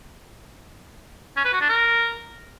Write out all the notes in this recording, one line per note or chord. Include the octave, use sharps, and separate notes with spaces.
C#4
B4
F#4
D4
A#4